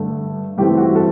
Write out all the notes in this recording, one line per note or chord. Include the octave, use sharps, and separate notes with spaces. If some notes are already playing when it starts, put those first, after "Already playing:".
Already playing: G2 D3 A3
G2 E3 A3 C4 G4
F#4
A4